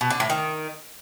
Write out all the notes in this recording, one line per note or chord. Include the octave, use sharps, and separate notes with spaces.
B2
D3
A2
D#3